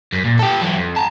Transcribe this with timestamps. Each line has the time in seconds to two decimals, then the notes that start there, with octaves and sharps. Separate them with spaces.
0.13 F#2
0.25 A#2
0.39 G4 A4
0.61 E3 F#3
0.76 F2
0.96 A5 A#5